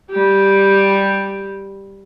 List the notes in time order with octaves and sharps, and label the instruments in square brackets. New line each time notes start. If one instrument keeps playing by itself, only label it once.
[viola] G3 G4